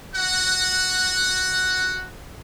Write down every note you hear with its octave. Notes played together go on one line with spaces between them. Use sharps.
F#4 F#5